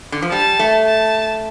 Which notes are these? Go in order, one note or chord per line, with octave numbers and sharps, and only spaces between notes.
D3
F3
G3 A5
A3
A5